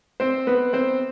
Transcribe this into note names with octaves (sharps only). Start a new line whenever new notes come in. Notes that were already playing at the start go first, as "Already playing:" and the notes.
C4 C5
B3 B4
C4 C5